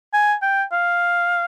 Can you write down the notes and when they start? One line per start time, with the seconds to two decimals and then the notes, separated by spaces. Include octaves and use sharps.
0.14 G#5
0.42 G5
0.72 F5